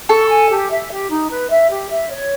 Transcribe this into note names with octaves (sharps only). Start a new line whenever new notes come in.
A4 C#6
G#5
G4
E5
G4
D#4
B4
E5
G4
E5
C#5